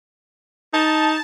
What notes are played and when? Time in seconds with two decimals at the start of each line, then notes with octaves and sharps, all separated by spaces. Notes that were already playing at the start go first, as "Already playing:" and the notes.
0.73 D#4 A5